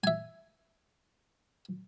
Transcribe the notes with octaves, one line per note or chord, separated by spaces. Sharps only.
E5 G#5